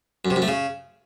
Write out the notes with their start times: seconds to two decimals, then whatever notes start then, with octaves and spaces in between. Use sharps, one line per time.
0.25 F#2
0.30 C3
0.36 F#2
0.42 A3
0.48 C#3